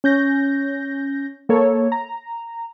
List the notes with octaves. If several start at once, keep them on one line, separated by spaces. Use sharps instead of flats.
C#4 G6 A#6
A#3 A4 C#5
A#5